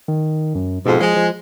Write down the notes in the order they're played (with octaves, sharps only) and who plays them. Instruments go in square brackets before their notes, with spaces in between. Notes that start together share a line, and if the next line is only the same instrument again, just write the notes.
[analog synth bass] D#3
F#2
[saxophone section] F2 G#2 [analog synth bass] B2
[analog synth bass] F3 [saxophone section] G#3
[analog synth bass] F3